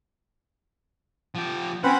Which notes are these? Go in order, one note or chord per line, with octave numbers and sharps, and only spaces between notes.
F3 G4
C4 C#4 B4 C5 F#5